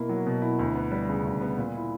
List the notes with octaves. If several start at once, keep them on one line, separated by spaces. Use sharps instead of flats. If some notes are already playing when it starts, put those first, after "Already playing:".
Already playing: B2 A#3 E4
F#3
B2
E4
D2
B3
G3
C#3
D2
B3
A#2
E4